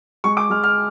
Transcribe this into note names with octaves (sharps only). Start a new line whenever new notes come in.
G#3 C#6
D6
G#3 F6
F6